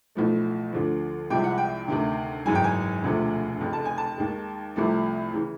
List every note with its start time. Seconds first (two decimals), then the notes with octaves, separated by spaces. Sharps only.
0.15 B1 A2 F3 A3
0.73 D2 D3 F3
1.30 C2 C3 F3 G#3 G5
1.44 F#5
1.58 G5
1.88 D2 C3 D#3
2.46 G#1 F#2 C#3 E3 G#5
2.55 G5
2.64 G#5
3.03 E1 D2 C3 F3 A3
3.61 F1 F2 C#3
3.73 A5
3.85 G#5
3.98 A5
4.18 D#2 D#3 G#3
4.76 C2 C3 F3 A3
5.33 C#3 E3